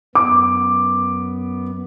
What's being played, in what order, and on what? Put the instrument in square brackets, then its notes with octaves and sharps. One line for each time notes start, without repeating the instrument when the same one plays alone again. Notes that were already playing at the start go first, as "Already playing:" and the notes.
[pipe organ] F#2 B3 [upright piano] D6